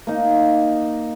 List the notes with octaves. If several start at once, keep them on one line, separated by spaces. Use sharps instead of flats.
A#3 D#4